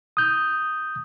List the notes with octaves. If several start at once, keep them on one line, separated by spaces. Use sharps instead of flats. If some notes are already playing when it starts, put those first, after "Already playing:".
D#6 G6